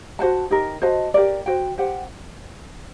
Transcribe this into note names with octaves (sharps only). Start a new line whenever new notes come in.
F#4 C5 F#5 A5
D#4 G4 A#4
F#4 C5 D#5 A5
G4 A#4 D5
F#4 C5 G5
G4 C5 F#5